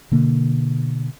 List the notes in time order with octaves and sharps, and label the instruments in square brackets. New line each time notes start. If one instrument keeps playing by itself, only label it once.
[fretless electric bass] B2 D3 A#3